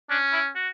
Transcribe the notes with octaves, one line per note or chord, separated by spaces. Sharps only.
C#4 D4
E4
F#4